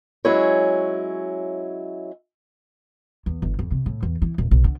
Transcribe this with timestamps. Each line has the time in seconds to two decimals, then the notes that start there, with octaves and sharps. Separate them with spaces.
0.25 F#3 G#3 C#4 E4 C#5
3.26 E2
3.42 G1
3.59 F2
3.71 C3
3.86 A2
4.03 E2
4.22 E3
4.38 D#1
4.51 B1
4.64 D3